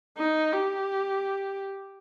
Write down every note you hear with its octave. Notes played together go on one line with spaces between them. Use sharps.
D#4
G4